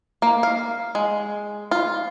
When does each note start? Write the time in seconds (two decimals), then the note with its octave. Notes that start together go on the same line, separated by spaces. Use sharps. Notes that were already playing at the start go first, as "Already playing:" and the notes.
0.22 A#3
0.43 F5
0.95 G#3
1.71 F4